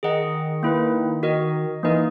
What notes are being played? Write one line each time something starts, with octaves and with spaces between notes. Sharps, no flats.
D#3 G#4 D#5 F#5
A#3 E4 B4
F#4 A#4 D#5
E3 A#3 D#4 A#4 D#5